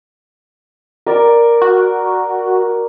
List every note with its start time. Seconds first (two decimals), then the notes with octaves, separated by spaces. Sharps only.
1.06 A#4 D5
1.62 F#4